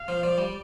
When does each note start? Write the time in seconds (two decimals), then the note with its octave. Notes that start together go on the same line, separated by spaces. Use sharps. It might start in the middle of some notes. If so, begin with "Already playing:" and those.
Already playing: F5
0.08 F3
0.23 F3 D5
0.38 G3